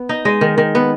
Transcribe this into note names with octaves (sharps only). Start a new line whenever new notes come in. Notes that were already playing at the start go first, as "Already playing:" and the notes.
Already playing: B3
D#4
G#3 D#5
D#3
D#3
B3